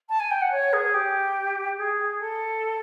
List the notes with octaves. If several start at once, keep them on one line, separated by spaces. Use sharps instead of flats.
A5
G#5
G5
F#5
C#5
G#4
G4
G#4
A4